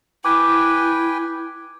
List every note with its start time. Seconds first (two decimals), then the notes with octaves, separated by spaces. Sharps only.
0.25 E4 B4 G5 G#5 D6